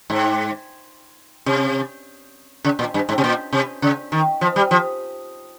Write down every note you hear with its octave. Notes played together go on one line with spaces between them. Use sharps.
G#2
C3
C#3
A#2
G2
G#2
C3
A#2
C3
C#3
D#3
F3
G3
F3